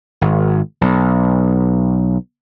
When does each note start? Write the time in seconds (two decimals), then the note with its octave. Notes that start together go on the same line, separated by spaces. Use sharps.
0.21 G#1
0.81 B1